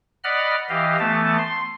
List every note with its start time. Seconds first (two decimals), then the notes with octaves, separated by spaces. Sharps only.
0.24 D5 D#5 F#5 B5 F6
0.69 E3 G4 D#5 F5
0.99 E3 A3 B3 A5
1.38 C6